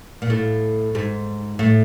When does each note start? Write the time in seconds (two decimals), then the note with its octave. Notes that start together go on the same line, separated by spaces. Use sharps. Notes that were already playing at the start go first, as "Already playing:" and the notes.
0.22 A#2
0.30 A2
0.95 G#2
1.59 A2